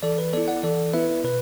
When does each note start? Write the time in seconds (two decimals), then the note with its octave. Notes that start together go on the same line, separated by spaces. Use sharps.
0.03 E3 A4 D5
0.18 B4
0.33 B3 E4 A4 D5
0.48 D5 F#5
0.63 E3 A4 D5
0.93 B3 E4 B4 E5
1.24 B2 B4